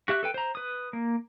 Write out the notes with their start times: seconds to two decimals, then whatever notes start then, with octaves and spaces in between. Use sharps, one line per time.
0.08 F#4 G4 E5 F#6
0.23 A4 B4 G5
0.34 C5 A#5
0.55 B4 D#6
0.93 A#3